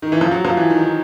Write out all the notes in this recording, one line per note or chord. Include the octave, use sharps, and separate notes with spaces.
D#3
E3
F3
F#3
F3
E3
D#3
D#3